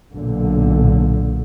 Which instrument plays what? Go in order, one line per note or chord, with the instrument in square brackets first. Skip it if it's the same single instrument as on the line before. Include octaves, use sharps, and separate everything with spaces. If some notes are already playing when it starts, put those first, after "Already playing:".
[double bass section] B1 A#2 D3